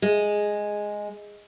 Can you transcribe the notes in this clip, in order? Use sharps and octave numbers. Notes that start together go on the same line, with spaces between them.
G#3